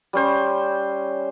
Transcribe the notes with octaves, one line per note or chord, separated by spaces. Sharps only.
G3 C#4 C5